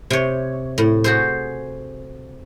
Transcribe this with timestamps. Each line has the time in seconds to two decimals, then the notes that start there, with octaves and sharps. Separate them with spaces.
0.10 C3 C#5
0.78 A2
1.04 F#4 G#4 C5